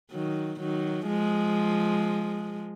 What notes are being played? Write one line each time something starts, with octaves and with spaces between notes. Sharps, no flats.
D#3 F#3
D#3 F#3
F3 G#3